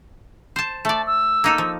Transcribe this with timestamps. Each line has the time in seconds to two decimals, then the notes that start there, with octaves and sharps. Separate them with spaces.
0.56 C5 A5
0.85 A3 D5 A5
1.06 E6
1.44 A#3 D#4 A4
1.58 F3